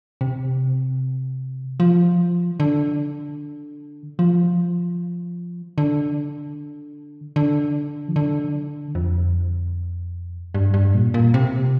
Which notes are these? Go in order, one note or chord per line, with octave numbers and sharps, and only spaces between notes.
C3
F3
D3
F3
D3
D3
F3
D3
F2
G2
G2
A#2
A#2
C3